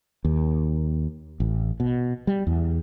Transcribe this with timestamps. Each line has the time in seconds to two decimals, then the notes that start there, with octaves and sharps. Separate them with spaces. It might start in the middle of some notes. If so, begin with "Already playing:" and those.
0.25 D#2
1.40 A1
1.80 B2
2.27 G3
2.47 E2